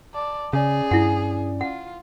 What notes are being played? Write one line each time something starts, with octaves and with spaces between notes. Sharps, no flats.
D5 A5
C#3 C#4 G#4 D5
G2 E4 F#5
F4 F#5